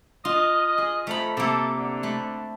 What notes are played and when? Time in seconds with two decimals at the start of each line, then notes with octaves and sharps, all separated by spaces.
0.25 F4 D#5
0.78 G#4
1.07 F2 A3 A#5 B5
1.37 C3 A#3 A4
1.76 D3
2.03 A3 B5